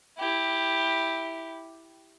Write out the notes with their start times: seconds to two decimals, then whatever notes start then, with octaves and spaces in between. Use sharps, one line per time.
0.18 E4 G4